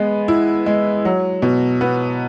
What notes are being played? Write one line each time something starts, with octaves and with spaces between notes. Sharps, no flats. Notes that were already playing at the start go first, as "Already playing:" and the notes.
Already playing: G#3 B3
E4
G#3
F#3
B2
B3